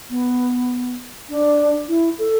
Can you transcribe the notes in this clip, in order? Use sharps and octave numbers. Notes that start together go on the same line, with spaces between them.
B3
D4
E4
A4